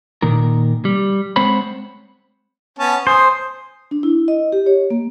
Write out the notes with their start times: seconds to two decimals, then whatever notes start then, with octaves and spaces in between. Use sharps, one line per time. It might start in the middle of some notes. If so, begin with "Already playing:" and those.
0.22 A#2 D#3 A#4
0.85 G3
1.36 G#3 C4 C5 C#5 F#5 B5
2.79 B3 C#4 A5
3.07 C5 G#5 D#6
3.91 D4
4.03 E4
4.28 D#5
4.52 G4
4.66 C#5
4.90 A#3